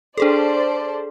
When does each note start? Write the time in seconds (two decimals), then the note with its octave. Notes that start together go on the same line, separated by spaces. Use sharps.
0.18 D4 G#4 A4 C5 D5 A5